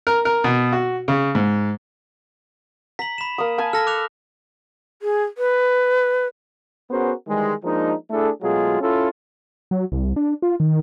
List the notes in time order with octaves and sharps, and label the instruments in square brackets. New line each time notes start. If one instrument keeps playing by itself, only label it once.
[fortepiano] A#4
A#4
B2
F#4
C#3
G#2
[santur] A#5 [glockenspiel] B6 F#7
[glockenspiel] B5 E7
[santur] A#3 D#6
F5 G#5 A5
[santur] A4 [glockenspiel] F6 A#6
[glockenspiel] D6 F#6 F7
[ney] G#4
B4
[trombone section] B3 C#4 F#4 G#4 A#4 C5
D#3 E3 G3 G#3
F3 G#3 A#3 D4 D#4
A3 D4 E4 G#4 A4
B2 F#3 G#3 A3 F4 G#4
C#4 E4 F4 A4
[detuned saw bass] F#3
C2
D4
F4
D#3